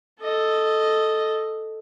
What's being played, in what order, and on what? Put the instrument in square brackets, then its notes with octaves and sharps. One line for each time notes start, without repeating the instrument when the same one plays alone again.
[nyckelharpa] A4 D#5